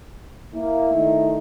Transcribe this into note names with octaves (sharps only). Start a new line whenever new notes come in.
A#3 E4
D#3 A3 D#4